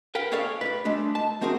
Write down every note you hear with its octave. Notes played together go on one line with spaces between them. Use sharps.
A#4 B4 F5 G5
G#4 A4 C#5 D5 F5
B4 C#5 D5
G#3 A3 D4
A5
A3 C4 F#4 G#4 A#4